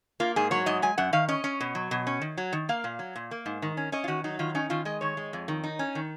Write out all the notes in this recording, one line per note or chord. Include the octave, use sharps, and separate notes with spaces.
A#3 F4
G#2 G#4
F#3 C#5
G#2 D#5
G#3 G#5
F#2 F#5
D#3 F5
C#4 D#5
C#4
B2
F#3
B2
C#4
D#3
F#3
D#3
A#3 F5
A#2
F#3
A#2
A#3
G#2
D#3
C#4
C#4 D#5
F4
D#3 F#4
F#3 D#4
D#3 F4
C#4 D#4
D#3 F4
G#3 D#5
D#3 C#5
G#3
F2
D#3
D#4
C#4
D#3